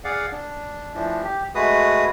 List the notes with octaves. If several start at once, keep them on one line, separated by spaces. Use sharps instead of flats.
G#4 D5 F5 F#5
D4
A2 E3 F3 D4
G4
G#3 A3 F#4 G#4 B4 D#6